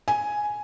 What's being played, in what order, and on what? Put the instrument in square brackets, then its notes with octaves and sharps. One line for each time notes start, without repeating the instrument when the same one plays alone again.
[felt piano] G#5